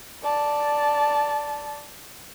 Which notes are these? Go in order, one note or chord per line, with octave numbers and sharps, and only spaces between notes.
D5 A5